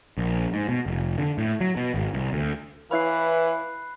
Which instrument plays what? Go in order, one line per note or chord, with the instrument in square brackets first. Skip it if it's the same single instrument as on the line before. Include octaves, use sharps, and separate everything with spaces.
[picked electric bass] A#1
G#2
B2
F1
D3
A2
F#3
B2
G#1
C2
D2
[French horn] E3 [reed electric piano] E4 C#5 F5 [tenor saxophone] B4 [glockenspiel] B5 F#6 C7